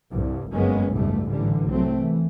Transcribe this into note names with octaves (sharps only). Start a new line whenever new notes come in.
C2 G2
G1 F#2 G#3 A#3 B3 C#4
F#1 C#2 G#2 B2 G3 A3
A1 D3 E3 G3
C2 F#3 A3 C4
E3